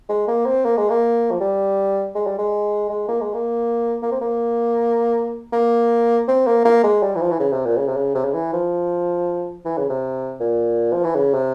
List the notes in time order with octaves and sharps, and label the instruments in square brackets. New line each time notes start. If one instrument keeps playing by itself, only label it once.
[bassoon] G#3
A#3
C4
A#3
G#3
A#3
F3
G3
G#3
G3
G#3
G#3
A#3
G#3
A#3
A#3
C4
A#3
A#3
C4
A#3
A#3
G#3
G3
E3
F3
E3
C#3
C3
A#2
C#3
C3
C#3
C3
C#3
E3
F3
E3
C#3
C3
A#2
F3
E3
C#3
C3